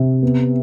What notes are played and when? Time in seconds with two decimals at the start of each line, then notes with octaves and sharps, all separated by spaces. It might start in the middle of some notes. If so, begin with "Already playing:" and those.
Already playing: C3
0.23 B3